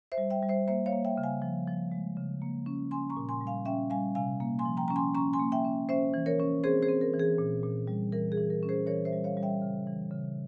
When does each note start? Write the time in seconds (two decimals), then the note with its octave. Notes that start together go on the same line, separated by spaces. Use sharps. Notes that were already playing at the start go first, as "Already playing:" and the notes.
0.12 C5 E5
0.18 G3
0.30 E5 G5
0.43 G3
0.49 C5 E5
0.68 A#3 C5 E5
0.86 C#5 F5
0.93 A#3
1.05 E5 G5
1.17 C#3
1.23 F5 G#5
1.42 F3
1.67 F3
1.92 G#3
2.17 C#3
2.42 A#3
2.66 C#4
2.91 C#4 G#5 C6
3.10 A#5 C#6
3.17 A#2
3.29 G#5 C6
3.41 G3
3.47 F5 G#5
3.65 C#4 E5 G5
3.90 G3 F5 G#5
4.15 C3 F5 G#5
4.40 A#3
4.59 G#5 C6
4.65 F3
4.77 G5 A#5
4.88 C#4 A#5
4.96 G#5 C6
5.14 C#4 A#5 C#6
5.33 G#5 C6
5.39 A#3
5.52 E5 G5
5.65 C#4
5.89 C#4 C5 E5
6.14 E3
6.26 A#4 C#5
6.39 C#4
6.64 C4 G#4 C5
6.82 G#4 C5
6.89 C4
7.01 A#4
7.13 E3
7.20 G#4
7.38 A#2
7.63 A#2
7.87 G3
8.12 E3 A#4
8.32 G#4
8.38 E3
8.50 A#4
8.63 C#4
8.69 G#4 C5
8.87 E3 A#4 C#5
9.05 C5 E5
9.12 G3
9.24 C#5 F5
9.37 G3
9.43 E5 G5
9.62 C#3
9.87 E3
10.11 C#3